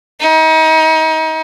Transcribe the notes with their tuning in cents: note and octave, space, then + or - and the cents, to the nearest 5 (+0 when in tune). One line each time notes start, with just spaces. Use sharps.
D#4 +35